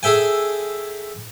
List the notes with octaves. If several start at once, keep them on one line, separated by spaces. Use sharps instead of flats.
G#4 A4 E5 G5 G#5